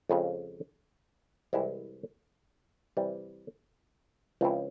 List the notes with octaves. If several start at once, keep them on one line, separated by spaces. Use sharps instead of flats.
F2 C#3 F3 G#3 C#4
C2 C3 E3 G#3 E4
C3 E3 G3
C#2 C#3 F3 C4 E4